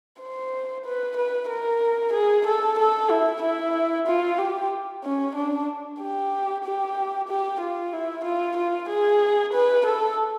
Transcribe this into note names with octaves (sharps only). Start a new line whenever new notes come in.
C5
B4
B4
A#4
G#4
A4
A4
E4
E4
F4
G4
C#4
D4
G4
G4
G4
F4
E4
F4
F4
G#4
B4
A4